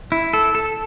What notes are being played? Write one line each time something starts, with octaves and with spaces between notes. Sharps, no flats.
E4
A4
A4